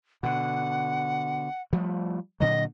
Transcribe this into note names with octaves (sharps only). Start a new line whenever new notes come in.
B2 D3 F#5
F3 G3 A3
A#2 D3 F#3 D#5